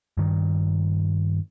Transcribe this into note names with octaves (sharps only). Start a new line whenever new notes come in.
G2 D#3